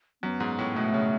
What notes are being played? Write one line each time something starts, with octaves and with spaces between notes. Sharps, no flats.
F#2 B3
G#2
A2
B2 A3
C#3